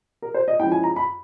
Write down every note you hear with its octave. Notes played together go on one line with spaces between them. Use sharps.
A#4
C5
D#5
F3 G#3 C#4 E4 G5
G#5
A#5
B5